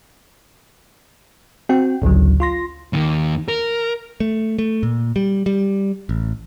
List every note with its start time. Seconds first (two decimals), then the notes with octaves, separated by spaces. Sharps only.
1.69 C4 F#4 G5
2.02 A1 D2 C#3 F#3
2.40 F4 C6 A#6
2.93 D#2 D#3
3.48 A#4
4.20 A3
4.59 A3
4.83 A#2
5.16 G3
5.46 G3
6.09 A1